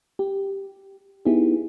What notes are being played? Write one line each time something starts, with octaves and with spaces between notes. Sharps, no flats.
G4
B3 D#4 E4 G4 G#4